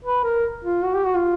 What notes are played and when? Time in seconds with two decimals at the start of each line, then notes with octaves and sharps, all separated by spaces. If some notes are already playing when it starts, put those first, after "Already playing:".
0.04 B4
0.24 A#4
0.64 F4
0.84 F#4
0.95 G4
1.05 F#4
1.15 F4